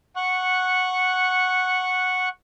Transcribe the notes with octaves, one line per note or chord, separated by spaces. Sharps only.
F#5 C#6 F#6